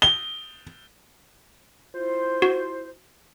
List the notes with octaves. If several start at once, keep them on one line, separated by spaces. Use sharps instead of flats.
G7
E4 F4 C5
F#4